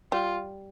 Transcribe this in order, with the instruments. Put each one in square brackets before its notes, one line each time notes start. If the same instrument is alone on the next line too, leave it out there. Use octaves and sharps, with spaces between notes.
[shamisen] G3 [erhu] F4